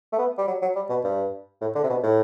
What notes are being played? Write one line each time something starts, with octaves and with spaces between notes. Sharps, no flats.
A3
B3
G3
F#3
F#3
G3
B2
G2
A2
D3
C3
B2
A2